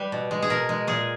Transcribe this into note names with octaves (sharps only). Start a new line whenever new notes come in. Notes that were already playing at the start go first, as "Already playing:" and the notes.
Already playing: G3 B4
B2
G#3
G#4
B2 A#4
G#3
A#2 G#4